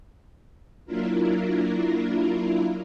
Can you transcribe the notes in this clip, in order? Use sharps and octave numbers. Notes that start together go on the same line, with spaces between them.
F#3 A#3 D4 E4 F4 A#4